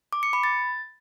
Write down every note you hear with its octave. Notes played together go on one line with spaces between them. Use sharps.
D6
C#7
B5
A6